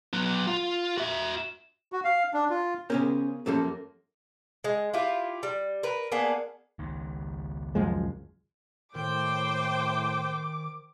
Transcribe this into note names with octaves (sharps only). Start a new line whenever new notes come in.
F#3 B3
F4
F#4 E5
F#4
F5
D4
F4
C#3 B3 C#4 G4 G#4 A#4 C5
F#2 F3 F#3 A3 A#3 C#4 G4 A4
G#3
E4 F4 G4
G3
A#4 B4
A#3 B3 D4 G#4
C#2 D#3
F#2 F3 G#3
A2 D#3 C5 G5 D6